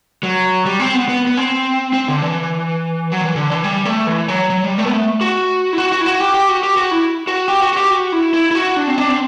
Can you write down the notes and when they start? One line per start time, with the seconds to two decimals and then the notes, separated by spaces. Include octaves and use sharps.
0.23 F#3
0.66 G3
0.80 C4
0.94 B3
1.09 B3
1.27 B3
1.37 C4
1.93 C4
2.08 D3
2.22 E3
3.12 F#3
3.21 E3
3.36 D3
3.50 E3
3.64 G3
3.86 A3
4.07 E3
4.28 F#3
4.50 F#3
4.64 G3
4.78 A3
4.87 B3
4.93 A3
5.21 F#4
5.73 E4
5.78 F#4
5.92 F#4
6.01 E4
6.06 F#4
6.20 G4
6.34 G4
6.49 F#4
6.63 G4
6.77 F#4
6.91 E4
7.27 F#4
7.48 G4
7.62 F#4
7.73 F#4
7.77 G4
7.91 F#4
8.12 E4
8.34 E4
8.51 E4
8.55 F#4
8.76 D4
8.87 C4
8.98 D4
9.09 C4